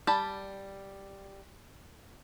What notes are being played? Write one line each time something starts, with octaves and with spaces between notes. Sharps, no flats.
G3 A5 B5